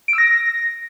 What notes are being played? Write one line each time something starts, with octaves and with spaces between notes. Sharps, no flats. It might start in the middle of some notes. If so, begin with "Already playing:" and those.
D7
E6
A#6